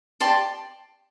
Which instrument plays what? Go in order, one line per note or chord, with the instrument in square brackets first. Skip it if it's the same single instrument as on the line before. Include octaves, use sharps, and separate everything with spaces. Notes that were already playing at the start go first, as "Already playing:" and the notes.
[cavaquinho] G4 D5 A5 C6